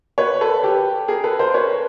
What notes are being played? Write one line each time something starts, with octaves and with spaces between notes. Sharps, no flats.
B4 C#5
A4 B4
G4 A4
G#4 A#4
A4 B4
A#4 C5
B4 C#5